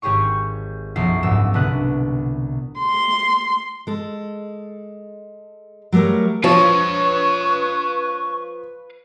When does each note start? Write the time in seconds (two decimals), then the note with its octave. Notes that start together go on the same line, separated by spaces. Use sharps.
0.02 G#1 G4 G#4 C#5 C#6
0.96 B1 F#2 F3 E4 C7
1.23 F#1 C#2 G#2 E6
1.54 C2 B2 D3 B4 D#6 F#6
2.80 C6
3.87 G#3 A4
5.92 F#3 G3 A3 A#4 C#5
6.44 F3 B4 C#5 F5 A5 C#6